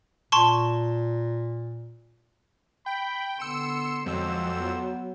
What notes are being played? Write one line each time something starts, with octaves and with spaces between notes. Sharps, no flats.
A#2 A5 C6 C#6
G5 B5
D3 B3 C6 E6 C#7 E7
F2 F#3 G#3 C5 E6
B3